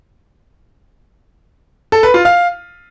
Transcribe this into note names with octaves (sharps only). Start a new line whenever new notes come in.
A4
B4
F4
F5